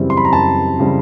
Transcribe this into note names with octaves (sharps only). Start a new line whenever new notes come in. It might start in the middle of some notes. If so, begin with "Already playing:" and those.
Already playing: F#2 C#3 E3 G3 C4
C6
B5
A#5
F#2 A5
C#3 E3 G3 C4